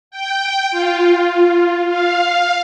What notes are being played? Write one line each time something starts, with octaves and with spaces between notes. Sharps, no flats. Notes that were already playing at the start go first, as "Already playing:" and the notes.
G5
F4
F5